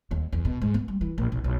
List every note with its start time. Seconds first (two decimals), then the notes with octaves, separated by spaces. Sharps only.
0.11 D#2
0.33 E2
0.45 B2
0.62 G#2
0.74 B3
0.88 G3
1.01 E3
1.18 A#1
1.32 B1
1.44 B1